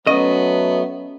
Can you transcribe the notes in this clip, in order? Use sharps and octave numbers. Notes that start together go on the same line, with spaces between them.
F#3 A3 B3 C#4 D#5